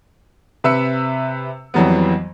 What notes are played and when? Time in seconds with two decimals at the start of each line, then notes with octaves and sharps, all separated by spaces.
0.64 C3 B4 E5 E6 C#7
1.74 F2 E3 F#3 G3 B3